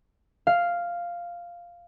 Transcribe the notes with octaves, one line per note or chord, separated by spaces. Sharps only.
F5